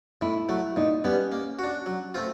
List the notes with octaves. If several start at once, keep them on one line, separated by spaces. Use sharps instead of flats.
A2 E4
F#3 A3
A#2 D#4
G3 B3 C#4
A#3
D4 F#4
F#3
A3 C4 F4